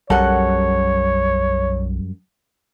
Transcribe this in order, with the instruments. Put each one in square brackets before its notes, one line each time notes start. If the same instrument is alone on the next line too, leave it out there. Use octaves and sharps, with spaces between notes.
[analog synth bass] B1 [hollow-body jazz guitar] F#2 G3 A4 [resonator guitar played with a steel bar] A#4 F#5 [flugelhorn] C#5